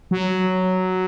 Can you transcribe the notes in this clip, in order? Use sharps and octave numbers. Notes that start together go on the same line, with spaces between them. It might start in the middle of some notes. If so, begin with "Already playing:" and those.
F#3